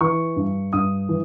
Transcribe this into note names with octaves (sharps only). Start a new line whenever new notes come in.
E3 C#6
G2
G2 D#6
E3